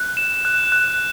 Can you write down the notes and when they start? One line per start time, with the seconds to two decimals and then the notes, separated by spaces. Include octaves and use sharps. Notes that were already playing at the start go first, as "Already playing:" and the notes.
Already playing: F#6
0.17 E7
0.45 F#6
0.72 F#6